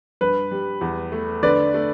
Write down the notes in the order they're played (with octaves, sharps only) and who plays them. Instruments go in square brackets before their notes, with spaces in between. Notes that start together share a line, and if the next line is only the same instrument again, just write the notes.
[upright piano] G2 [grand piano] B4
[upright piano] G3
E2
A3
[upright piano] D3 [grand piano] B4 D5
[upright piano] A3